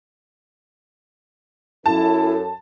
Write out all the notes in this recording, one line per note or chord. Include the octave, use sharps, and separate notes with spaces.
F#2 E4 A4 A5